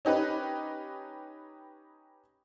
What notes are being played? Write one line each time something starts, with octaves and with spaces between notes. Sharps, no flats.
C#4 D#4 G4 B4